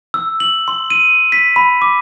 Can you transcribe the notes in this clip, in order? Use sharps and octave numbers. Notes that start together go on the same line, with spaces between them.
E6
F#7
C6
D#7
B6
B5
D6